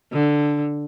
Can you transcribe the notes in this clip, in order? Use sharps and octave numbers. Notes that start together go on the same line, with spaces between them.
D3